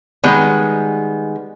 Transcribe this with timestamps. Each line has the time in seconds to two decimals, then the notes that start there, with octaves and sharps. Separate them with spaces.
0.24 D#3 G3 G#3 B3